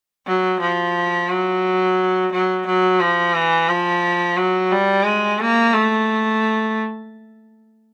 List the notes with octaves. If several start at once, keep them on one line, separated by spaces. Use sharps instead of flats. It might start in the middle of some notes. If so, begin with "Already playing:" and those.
F#3
F3
F#3
F#3
F#3
F3
E3
F3
F#3
G3
G#3
A#3
A3